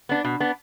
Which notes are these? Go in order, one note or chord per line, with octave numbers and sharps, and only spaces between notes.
B3 D4
B2
B3 D4